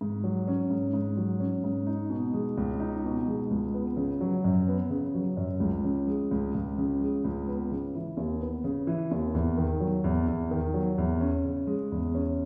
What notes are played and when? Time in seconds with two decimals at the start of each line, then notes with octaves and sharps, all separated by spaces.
0.01 G#2
0.24 F#3
0.48 C#4
0.70 G#2
0.93 G#2
1.17 F#3
1.40 C#4
1.64 G#2
1.87 D#4
2.10 B2
2.34 G#3
2.57 C#2
2.80 D#4
3.04 B2
3.28 G#3
3.51 C#2
3.74 B3
3.97 C#3
4.21 F#3
4.44 F#2
4.68 B3
4.90 C#3
5.15 F#3
5.37 F#2
5.60 C#2
5.84 C#3
6.07 G#3
6.31 C#2
6.55 C#2
6.78 C#3
7.01 G#3
7.24 C#2
7.48 B3
7.71 C#3
7.95 E3
8.17 D#2
8.41 B3
8.64 C#3
8.87 E3
9.11 D#2
9.34 E2
9.58 D#3
9.80 F#3
10.04 E2
10.28 E2
10.51 D#3
10.74 F#3
10.98 E2
11.20 C#4
11.45 C#3
11.67 G#3
11.92 E2
12.15 C#4